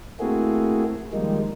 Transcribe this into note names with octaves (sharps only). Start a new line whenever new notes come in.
A3 A#3 C4 E4 F#4 G#4
D#3 F3 G3 G#3 A#3 D#4